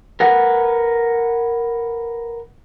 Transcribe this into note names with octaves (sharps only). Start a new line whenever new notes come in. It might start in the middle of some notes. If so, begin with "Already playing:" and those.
A#4 B4 F#5